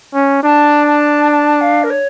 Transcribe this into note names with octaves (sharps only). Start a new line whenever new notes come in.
C#4
D4 A5
A5
A5
F5
A#4
C#5